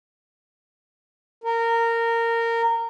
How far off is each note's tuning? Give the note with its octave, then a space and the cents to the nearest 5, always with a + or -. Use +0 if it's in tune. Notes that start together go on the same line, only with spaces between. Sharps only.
A#4 -15